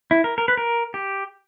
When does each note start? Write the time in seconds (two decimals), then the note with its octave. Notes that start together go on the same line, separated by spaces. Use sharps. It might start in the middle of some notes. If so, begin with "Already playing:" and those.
0.11 E4
0.24 A#4
0.38 A#4
0.48 B4
0.57 A#4
0.94 G4